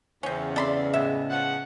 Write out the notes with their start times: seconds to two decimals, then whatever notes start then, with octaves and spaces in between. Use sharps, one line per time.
0.23 E2 C#3 C4 C#4
0.56 C4 A4 D5 B5 C6
0.93 A2 G#3 B3 E5
1.30 F3 C#4 F#5